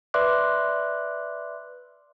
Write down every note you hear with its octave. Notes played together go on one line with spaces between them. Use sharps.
B4 D5 E5 C6 D6 F#6